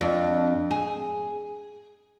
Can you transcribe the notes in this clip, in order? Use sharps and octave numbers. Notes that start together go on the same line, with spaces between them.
F2 D4
G#4